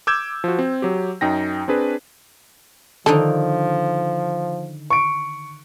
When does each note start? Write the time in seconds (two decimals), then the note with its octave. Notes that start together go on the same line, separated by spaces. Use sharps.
0.07 D6 E6 G6 G#6 E7
0.44 F3 F#4
0.59 C4
0.82 F#3 G4
1.21 F#2 D#4 G5 A#6
1.68 C4 D4 G#4 B4
3.06 D3 D#3 F3 D#4 A4
4.90 C#6 D7